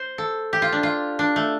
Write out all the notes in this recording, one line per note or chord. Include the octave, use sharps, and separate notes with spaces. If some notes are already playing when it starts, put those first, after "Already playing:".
Already playing: C5
A4
G4
F4
D4
F4
D4
A3